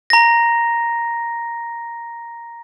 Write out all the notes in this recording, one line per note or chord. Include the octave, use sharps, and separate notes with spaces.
A#5 A#6